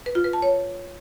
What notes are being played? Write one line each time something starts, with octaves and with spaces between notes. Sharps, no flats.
B4
F4
B4
A5
C#5